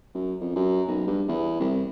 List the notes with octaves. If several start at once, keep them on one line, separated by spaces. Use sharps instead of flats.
F#2
F2
F#2
B1
G2
E2
C2